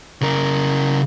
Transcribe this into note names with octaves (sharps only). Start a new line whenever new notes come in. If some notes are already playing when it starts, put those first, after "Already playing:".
C#3 A#4